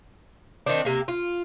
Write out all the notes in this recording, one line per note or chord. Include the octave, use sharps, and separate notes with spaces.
D#3 C4 D4
C3 A#3
F4